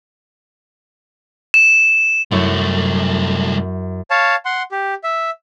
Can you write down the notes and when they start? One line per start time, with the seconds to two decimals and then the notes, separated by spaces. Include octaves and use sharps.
1.54 E7
2.31 C2 F#2 A3 E4 C#5
4.10 C#5 F5 A5
4.45 F#5 C6
4.71 G4
5.03 E5